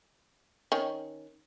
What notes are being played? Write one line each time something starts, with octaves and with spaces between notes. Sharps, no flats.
D#3 C#4